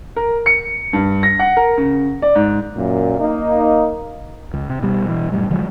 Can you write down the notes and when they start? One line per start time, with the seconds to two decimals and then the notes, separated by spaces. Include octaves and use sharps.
0.16 A#4
0.46 C#7
0.93 G2
1.23 A#6
1.39 F#5
1.57 A#4
1.77 C#3
2.22 D5
2.35 G#2
2.76 F#2 A#2
3.19 A#3 D#4
4.53 C#2
4.69 C3
4.82 B2 G3
5.09 B2 E3
5.32 F#2 A2 G3
5.50 D3 F3 F#3 G#3